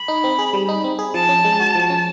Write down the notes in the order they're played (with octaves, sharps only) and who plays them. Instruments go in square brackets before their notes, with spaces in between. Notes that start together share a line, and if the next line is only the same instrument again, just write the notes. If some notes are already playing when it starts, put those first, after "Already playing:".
Already playing: [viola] B5
[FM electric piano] D#4
C4
G#4
G3
D#4
C4
G#4
[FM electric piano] F3 [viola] A5
[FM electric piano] C#4
G#3
F#4
F3
C#4